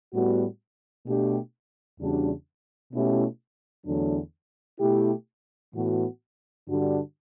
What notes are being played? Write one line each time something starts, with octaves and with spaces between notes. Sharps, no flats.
A2 G3 B3 F#4
B2 A3 D4 G4
E2 C#3 G3 D4 F#4
B2 A3 C#4 E4 G4
E2 D3 F#3 A3 D4
B2 A3 E4 G4
A2 E3 B3 F#4
G2 D3 G3 D4 F#4